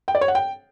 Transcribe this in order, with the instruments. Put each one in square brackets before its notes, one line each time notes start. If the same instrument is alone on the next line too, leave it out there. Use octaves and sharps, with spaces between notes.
[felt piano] G5
D5
C#5
F#5
G5